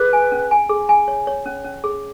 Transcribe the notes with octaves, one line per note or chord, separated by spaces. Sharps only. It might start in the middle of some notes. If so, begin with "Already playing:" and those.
Already playing: G#4 B4
G#5
C#4
G#5
G#4
G#5
C#5
C#5
C#4
C#4
G#4